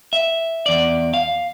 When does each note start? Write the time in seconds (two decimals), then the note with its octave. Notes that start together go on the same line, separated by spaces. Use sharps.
0.13 E5
0.66 E2 D5
1.14 F5